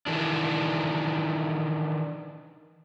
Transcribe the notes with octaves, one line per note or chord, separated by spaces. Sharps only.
D#3 E3 D4